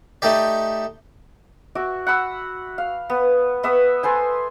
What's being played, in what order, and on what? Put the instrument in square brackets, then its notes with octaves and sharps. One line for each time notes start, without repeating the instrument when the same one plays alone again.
[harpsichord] A3 D#4 G4 D5
[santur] F#4 E5 D6
F#5 B5 E6
F5
B3
B3 E5 C#6 D#6
A4 B4 C5 G#5